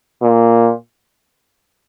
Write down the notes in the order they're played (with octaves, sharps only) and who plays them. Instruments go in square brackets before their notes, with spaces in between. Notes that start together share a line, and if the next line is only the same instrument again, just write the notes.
[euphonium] A#2